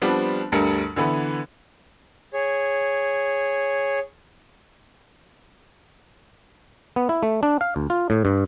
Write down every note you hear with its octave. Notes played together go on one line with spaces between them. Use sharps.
F3 G3 B3 C4 D4
D2 G2 G3 A4 A#4 C#7
D3 E3 B3 B4
G#4 C#5
B3
E4
A3
D4
F5
D2
F4
A2
G2